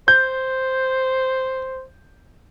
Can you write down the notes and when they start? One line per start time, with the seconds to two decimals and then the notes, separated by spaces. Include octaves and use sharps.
0.08 C5 G6